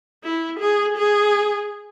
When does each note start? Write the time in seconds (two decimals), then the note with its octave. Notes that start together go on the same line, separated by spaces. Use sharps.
0.24 E4
0.60 G#4
0.98 G#4